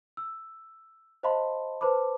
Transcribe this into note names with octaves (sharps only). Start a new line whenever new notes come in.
E6
C5 D#5 F5 A5 B5 C6
B4 C5 A5 B5 D6